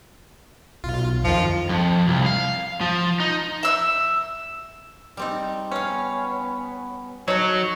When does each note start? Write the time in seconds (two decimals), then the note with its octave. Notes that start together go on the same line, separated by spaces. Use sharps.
0.84 B1 F4
1.24 F2 D#3 F3 F4
1.69 F2
2.08 C2
2.26 F5
2.81 F3
3.20 D#4
3.63 E5 E6
5.17 G3 C4 D#4
5.71 B3 C#4 C#5 F5
7.28 F#3 D#4 A4 C#5